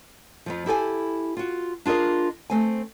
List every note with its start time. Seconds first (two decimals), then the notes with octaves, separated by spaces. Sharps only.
0.46 F2 G#2 F3
0.66 E4 G4 A4 G#5
1.37 F4 F#4
1.86 D4 F4 G#4 A#4 D#5
2.50 A3 C4 G#5